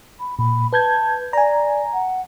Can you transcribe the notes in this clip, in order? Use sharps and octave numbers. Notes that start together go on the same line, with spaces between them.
B5
A#2 B5
B4 A5 G6 G#6
D5 G#5 A#5
F#5